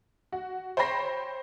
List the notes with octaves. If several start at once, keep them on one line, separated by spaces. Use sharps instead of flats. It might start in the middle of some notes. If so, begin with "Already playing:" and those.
F#4
C5 C#5 G5 B5 A#6 C7